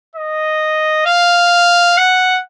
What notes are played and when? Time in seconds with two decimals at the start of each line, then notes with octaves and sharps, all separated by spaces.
0.16 D#5
1.06 F5
1.98 F#5